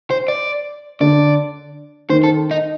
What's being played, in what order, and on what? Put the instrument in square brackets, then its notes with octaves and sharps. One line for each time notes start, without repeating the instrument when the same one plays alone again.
[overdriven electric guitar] C5
D5
[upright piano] D3 [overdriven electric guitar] D5
[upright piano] D#3 [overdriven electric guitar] C5
[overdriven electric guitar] A4
D#4